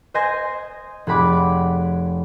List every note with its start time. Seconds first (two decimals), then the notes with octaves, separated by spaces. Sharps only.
0.14 C5 D#5 G#5 G6 A#6
1.07 F1 G#4 F#5 B5 D6